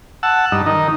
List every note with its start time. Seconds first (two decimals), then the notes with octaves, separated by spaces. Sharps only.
0.23 F#5 A5 E6
0.52 G2 D#4
0.66 D#3 D#4